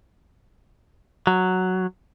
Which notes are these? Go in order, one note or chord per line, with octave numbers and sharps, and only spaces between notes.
F#3